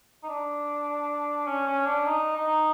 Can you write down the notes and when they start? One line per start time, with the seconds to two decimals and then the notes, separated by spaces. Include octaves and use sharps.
0.23 D#4
0.29 D4
1.47 C#4
1.67 C#4
1.86 D4
2.06 D#4
2.36 D#4